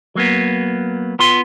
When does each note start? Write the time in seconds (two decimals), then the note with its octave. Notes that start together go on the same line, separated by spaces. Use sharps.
0.15 F#3 A#3 B3
1.19 B3 F4 C6